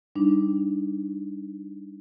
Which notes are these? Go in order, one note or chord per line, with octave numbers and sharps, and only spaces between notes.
G3 D4 D#4